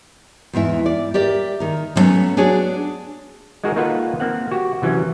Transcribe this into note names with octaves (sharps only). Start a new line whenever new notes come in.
E2 G#2 E3 E5
D5
G4 A#4 D5 E5
D#3 A#4
D3 F#3 A3 B3 C#4
D4 F#4 G#4 C#5 D5
G#3 D#4 F#4 G#4 A#4
A#3 D#4 F4 A4 B4 F#5
A#3 C4 F#5
F#4 G4
C3 E3 F#3 C#4